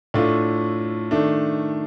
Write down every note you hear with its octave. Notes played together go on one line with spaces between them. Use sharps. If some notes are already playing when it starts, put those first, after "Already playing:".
A2 A3 D4 F4
D#3 A3 D4